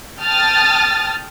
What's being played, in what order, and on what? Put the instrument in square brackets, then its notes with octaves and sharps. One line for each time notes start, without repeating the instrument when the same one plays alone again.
[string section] G5 A5 D#6 F6 A6